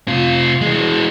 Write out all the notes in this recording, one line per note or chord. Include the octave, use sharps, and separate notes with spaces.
C3 F4
E3 G#3